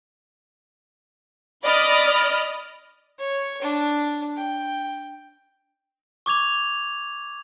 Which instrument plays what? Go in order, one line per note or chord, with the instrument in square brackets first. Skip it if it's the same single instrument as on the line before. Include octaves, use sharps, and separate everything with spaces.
[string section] D5 D#5 B5 D#6 F6
[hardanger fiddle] C#5
D4
G5
[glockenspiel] C#6 D6 G#6 F7